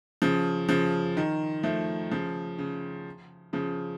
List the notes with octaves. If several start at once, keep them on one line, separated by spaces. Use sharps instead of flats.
C#3 F3
C#3 F3
D#3
F3 A3
C#3 F3
C#3
C#3 F3